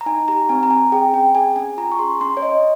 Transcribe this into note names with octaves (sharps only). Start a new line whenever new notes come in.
A#5
D#4 G#5
G4 A#5
C4 G#5
A#5
C4 G#5
G#4 G5
C#4 G5
G#4 G#5
C#4 G#5
F4 A#5
C#6
G#4 C6
C#4 C6
C#5
C#4 D#5